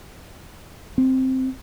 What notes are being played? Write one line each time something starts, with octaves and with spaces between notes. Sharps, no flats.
C4